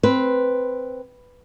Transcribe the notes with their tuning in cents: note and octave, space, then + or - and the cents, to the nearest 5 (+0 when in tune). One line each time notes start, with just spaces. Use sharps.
C4 +0 B4 +0